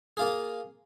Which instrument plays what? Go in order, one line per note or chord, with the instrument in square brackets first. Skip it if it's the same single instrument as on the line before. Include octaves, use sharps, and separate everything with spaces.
[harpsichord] A#3 F4 G#4